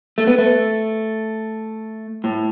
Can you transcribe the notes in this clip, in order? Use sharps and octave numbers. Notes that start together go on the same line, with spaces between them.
A3
B3
A3
A2